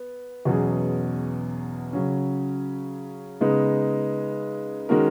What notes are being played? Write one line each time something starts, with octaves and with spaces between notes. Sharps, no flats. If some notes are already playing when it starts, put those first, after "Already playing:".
Already playing: B3
E2 B2 F#3 C#4 G#4
C#3 F#3 C#4
C#3 G#3 B3 D#4
D#3 G#3 C#4 F#4 A#4